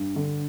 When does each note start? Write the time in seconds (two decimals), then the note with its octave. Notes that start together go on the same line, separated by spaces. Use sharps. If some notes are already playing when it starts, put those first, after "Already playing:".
Already playing: G2
0.16 D3